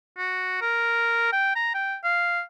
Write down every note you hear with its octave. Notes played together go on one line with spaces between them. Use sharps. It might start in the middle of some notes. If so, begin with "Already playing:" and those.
F#4
A#4
G5
A#5
G5
F5